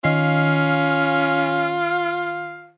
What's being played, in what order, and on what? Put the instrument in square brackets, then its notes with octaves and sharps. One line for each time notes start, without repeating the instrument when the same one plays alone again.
[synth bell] D#3 C7 [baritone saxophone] C#4 [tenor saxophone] F4 [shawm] F5